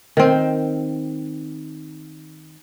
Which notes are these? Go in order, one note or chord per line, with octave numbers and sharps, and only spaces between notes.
D#3 C4